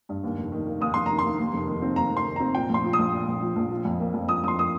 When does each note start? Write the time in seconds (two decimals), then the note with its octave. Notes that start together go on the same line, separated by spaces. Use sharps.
0.09 G2
0.24 D#2
0.37 F1
0.52 D#3
0.67 A#3
0.81 D#2 D#6
0.94 F1 C6
1.06 D#3 A#5
1.19 C6
1.24 A#3
1.39 D#2
1.53 F1
1.67 D#3
1.82 C4
1.96 D#2 A#5
2.11 F1
2.17 C6
2.25 D#3
2.36 C4 A#5
2.54 A#2 G5
2.69 A#1 C6
2.84 F3
2.93 D#6
2.99 A#1
3.12 A#2
3.28 A#1
3.42 F3
3.56 A#1
3.71 F3
3.85 F2
4.00 A#3
4.14 F2
4.29 F3 D#6
4.44 F2 D#6
4.48 C6
4.57 A#3 D#6